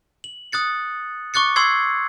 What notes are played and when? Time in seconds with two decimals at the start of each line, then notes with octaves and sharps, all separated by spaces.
0.24 F#7
0.52 D#6 F#6 A6 C#7
1.34 C#6 D6 F#6 A6 C#7
1.56 C6 C#6 E6 G#6 C7